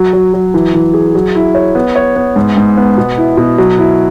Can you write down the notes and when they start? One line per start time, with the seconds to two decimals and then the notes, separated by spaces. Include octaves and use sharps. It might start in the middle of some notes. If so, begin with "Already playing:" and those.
Already playing: F#3
0.13 F#3
0.34 F#3
0.54 E3
0.74 E3
0.94 G#4
1.15 F#3
1.35 E4
1.55 C#5
1.75 B3
1.96 C#5
2.16 B3
2.36 G#2
2.57 G#2
2.77 B3
2.98 B2
3.18 E4
3.37 B2
3.58 F#3
3.78 E4